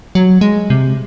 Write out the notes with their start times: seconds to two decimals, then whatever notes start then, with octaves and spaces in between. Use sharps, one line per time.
0.15 F#3
0.41 G#3
0.70 C3